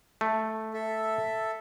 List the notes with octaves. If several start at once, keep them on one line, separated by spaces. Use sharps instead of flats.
A3
A4 E5